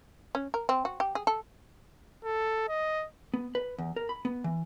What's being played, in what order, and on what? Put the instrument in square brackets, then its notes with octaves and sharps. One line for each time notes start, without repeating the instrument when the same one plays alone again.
[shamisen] C#4
A#4
C4
F#4
G4
G#4
A4
[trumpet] A4
D#5
[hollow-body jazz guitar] B3
B4
E2
A#4
B5
B3
E3